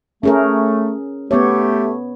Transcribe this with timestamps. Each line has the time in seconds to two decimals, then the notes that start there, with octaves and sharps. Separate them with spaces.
0.23 A3 C#4 G#4 A#4
1.31 A3 B3 G4 C#5